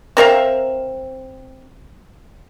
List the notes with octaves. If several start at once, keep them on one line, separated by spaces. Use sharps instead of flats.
C4 A#4 E5 F5